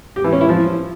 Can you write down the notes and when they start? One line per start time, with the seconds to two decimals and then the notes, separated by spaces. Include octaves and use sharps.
0.16 G4
0.24 E3
0.33 C#4
0.41 E4
0.49 F3